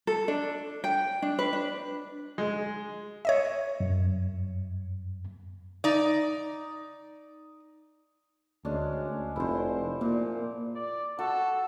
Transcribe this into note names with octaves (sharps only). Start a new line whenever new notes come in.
A4
D4
G5
D4
B4
D4
G#3
C#5 D#5 E5
F#2
D#4 D5
D2 G#3 C#4 D4
F1 E4 C5
A#2 A#3
D5
F#4 A4